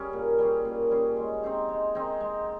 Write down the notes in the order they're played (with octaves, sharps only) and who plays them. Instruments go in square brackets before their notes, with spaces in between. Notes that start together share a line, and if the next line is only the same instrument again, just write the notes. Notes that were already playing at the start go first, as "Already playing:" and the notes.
Already playing: [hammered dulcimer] G3 C#4 G#4
A#2
G3 C#4 G#4
A#2
G3 C#4 G#4
G#3
C4 D#4 G#4
G#3
C4 D#4 G#4
G#3